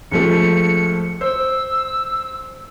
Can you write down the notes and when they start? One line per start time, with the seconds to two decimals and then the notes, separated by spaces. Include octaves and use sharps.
0.12 C#2 F3 A3 C#7
1.21 C5 E6